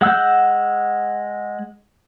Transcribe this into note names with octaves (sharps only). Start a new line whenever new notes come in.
G#3 F#5 E6 F#6 G6